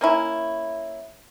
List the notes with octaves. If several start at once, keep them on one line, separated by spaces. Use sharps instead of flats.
A#3 C#4 E4